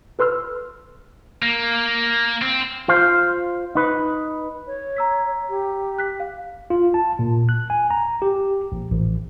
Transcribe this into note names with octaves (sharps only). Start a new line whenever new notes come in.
A4 B4 C6 E6 F6
A#3
C4
F4 C5 F5
D#4 B4
C#5
A#5 E6 B6
G4
F#6 B6
F5
F4
A5
A#2
F#6
G#5
A#5
G4
A#1
A1